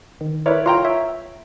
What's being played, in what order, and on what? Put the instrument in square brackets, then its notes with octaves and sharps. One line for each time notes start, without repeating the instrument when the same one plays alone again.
[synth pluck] D#3
[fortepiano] E4 C#5 D5 [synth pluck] A#4 B4
[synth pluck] F4 C#5 F6 [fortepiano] G5 A#5 C6
[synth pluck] C#5 E5